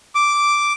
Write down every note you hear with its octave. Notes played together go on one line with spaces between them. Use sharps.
D6